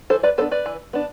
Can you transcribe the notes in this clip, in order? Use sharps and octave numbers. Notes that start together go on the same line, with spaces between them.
E3 A4 C5
B4 D5
B3 D4 A4 C5
B4 D5
E3
B3 D4